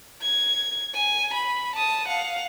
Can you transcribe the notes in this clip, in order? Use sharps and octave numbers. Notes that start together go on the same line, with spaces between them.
G#6
G#5
B5
A5 D#6
F5 F#5